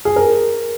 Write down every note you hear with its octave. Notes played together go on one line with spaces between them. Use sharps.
G#4
A#4